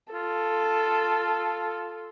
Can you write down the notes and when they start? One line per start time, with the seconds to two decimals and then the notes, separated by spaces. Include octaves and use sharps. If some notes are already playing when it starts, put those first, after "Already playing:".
0.13 F4 A4